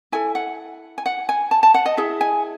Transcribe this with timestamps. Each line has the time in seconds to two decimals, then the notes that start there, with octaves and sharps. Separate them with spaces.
0.12 E4 A4 G#5
0.35 F#5
0.98 G#5
1.06 F#5
1.29 G#5
1.51 A5
1.63 A5
1.74 F#5
1.86 D#5
1.97 E4 G#4 E5
2.21 G#5